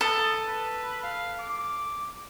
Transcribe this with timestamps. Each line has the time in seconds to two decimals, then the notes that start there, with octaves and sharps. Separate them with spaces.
0.01 A4 D#6
0.48 B4
1.03 F5
1.39 D6